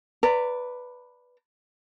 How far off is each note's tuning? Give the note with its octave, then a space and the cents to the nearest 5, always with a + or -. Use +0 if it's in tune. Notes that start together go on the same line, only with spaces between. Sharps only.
B4 +0 D5 -5 A#5 -35